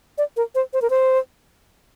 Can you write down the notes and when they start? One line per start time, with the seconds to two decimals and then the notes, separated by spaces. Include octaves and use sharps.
0.18 D5
0.37 A#4
0.55 C5
0.73 C5
0.82 A#4
0.90 C5